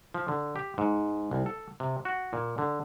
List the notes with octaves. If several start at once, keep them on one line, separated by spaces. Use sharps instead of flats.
F3
D3
G4
G#2
C2
A4
C3
F#4
A#2
D3